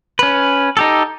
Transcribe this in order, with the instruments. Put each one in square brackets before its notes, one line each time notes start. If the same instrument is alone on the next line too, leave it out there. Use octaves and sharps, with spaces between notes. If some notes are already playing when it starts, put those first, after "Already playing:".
[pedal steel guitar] C#4 B4
D#4 G4 A4